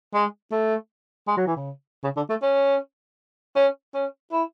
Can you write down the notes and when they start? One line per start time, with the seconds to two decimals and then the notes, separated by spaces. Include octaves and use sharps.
0.14 G#3
0.52 A3
1.28 G#3
1.37 F#3
1.47 E3
1.56 C#3
2.04 C#3
2.17 D3
2.30 A3
2.42 C#4
3.56 C#4
3.94 C#4
4.32 E4